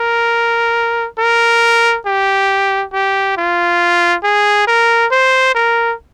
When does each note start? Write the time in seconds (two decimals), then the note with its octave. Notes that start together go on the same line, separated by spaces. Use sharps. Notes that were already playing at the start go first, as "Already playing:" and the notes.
Already playing: A#4
1.19 A#4
2.06 G4
2.93 G4
3.37 F4
4.24 G#4
4.67 A#4
5.11 C5
5.55 A#4